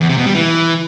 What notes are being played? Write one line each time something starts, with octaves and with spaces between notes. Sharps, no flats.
E2
C3
B2
G3
E3